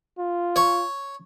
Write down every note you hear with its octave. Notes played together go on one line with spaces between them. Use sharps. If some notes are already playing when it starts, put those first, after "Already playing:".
F4
C#5